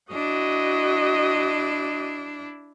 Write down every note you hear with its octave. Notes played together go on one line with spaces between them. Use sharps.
D4 E4 F#4 D#5